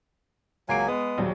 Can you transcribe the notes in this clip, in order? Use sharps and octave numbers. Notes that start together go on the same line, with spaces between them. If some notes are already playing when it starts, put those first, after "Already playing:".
C#2 F#3 A#3 G#5 C7 D7
G#3 B3 D#6
A#1 D#2 F#3